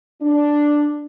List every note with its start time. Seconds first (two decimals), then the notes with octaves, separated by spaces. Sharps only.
0.21 D4